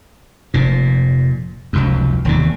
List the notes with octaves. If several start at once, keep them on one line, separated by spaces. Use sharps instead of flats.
F1 A#2
F1 C#2 F#2
E1 D#2 C3